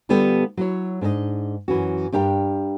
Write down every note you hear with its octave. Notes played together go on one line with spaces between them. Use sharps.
D3 G3 B3 F4 G4 A4
F#3 E4 C#5
G#2 D4 D#4 A4 D#5
F#2 E3 C#4 F#4
G2 D4 G4 A#4 G5